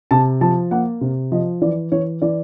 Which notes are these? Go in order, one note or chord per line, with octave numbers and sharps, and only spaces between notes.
C3 A5
F3 A5
A#3 F#5
C3
F3 D#5
E3 D5
E3 C#5
E3 D5